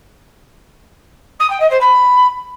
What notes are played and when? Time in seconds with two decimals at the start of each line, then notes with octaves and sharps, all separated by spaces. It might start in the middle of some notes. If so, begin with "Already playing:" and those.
1.39 D#6
1.50 G5
1.60 D#5
1.70 C5
1.80 B5